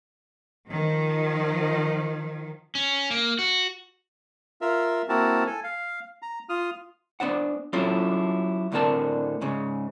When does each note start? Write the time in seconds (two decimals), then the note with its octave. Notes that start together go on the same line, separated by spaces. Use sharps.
0.72 D#3 F3
2.75 C#4
3.11 A#3
3.39 F#4
4.61 F4 A#4 E5
5.09 A#3 C4 E4 F#4 A#4 A5
5.47 A4 G#5
5.64 F5
6.22 A#5
6.49 F4 D#6 F6
7.20 B3 D4 C5 F#5
7.73 F#3 C#4 E4 F4 A4
8.72 D2 A2 D3 C4 A#4 A5
9.41 G#2 C#3